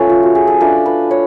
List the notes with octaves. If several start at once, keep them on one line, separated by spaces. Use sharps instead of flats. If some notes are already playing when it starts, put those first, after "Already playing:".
Already playing: F3 A3 C#4 A4 B4 C#5
F4
F#4
G#4
A4
A3 D4 F4 B4
B4
C#5